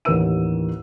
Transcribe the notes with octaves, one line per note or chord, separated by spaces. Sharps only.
A1 D#2 A#4 B4 E6 D#7